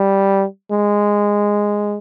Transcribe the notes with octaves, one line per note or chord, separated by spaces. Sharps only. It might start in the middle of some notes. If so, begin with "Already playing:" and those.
Already playing: G3
G#3